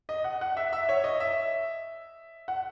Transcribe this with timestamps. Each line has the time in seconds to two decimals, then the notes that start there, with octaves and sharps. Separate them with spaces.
0.09 D#5
0.24 F#5
0.41 F#5
0.57 E5
0.73 E5
0.89 C#5
1.04 D#5
1.20 E5
2.48 F#5